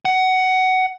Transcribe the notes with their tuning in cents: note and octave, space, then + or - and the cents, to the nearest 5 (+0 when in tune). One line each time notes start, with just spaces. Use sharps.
F#5 +15